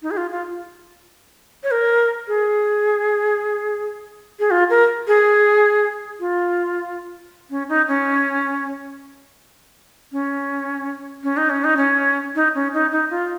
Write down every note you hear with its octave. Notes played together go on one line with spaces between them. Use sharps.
D#4
G#4
F4
F4
C#5
A#4
G#4
G#4
F4
A#4
G#4
F4
C#4
D#4
C#4
C#4
C#4
D#4
C#4
D#4
C#4
D#4
C#4
D#4
D#4
F4